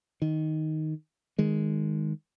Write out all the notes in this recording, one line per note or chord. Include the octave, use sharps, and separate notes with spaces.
D#3
D#3 G#3